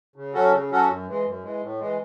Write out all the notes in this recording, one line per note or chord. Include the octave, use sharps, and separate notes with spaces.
C#3
F#3 C#4 F#4 A4
C#3
F#3 C#4 F#4 A4
F#2
E3 G#3
F#2
E3 G#3
A2
E3 G#3